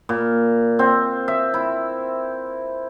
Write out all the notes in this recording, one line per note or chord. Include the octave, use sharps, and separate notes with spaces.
A#2
C4
E5
E4